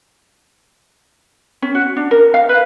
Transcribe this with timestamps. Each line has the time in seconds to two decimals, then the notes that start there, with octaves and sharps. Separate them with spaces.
1.62 C#4
1.75 F#4
1.96 D4
2.11 A#4
2.34 F5
2.49 B4